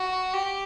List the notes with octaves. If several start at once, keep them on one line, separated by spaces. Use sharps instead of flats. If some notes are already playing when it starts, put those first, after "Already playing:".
Already playing: F#4
G4